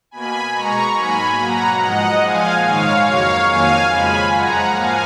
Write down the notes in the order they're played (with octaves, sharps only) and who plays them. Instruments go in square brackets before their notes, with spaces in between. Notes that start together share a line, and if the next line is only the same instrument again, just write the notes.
[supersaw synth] B2 A#3 G#5 B5
B2 G#3 A#5 C#6
G#2 F#3 A#3 G#5 B5
B2 F#3 A#3 F#5 A#5
G#2 F3 G#3 D#5 F#5
A#2 F3 G#3 F5 G#5
G#2 D#3 G#3 C#5 F5
F2 C#3 F#3 A#3 C#5 F5
F2 D#3 F#3 A#3 F5 G#5
F2 C#3 F3 G#3 G#5 B5
F#2 F3 G#3 F#5 A#5
G#2 F3 A#3 F5 G#5